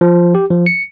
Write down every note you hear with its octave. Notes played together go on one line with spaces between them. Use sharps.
F3
G4
F3
C#7